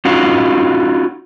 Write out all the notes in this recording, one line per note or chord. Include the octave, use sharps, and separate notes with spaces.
C#4 D#4 F4 F#4